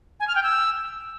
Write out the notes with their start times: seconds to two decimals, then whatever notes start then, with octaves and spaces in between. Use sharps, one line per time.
0.20 G#5
0.28 F6
0.35 G5
0.43 E6